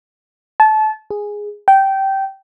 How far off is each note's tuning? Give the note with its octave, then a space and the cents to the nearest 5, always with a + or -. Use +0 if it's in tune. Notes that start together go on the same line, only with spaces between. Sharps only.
A5 -25
G#4 -5
G5 -15